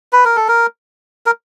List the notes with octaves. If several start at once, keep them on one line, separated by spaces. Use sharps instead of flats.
B4
A#4
A4
A#4
A#4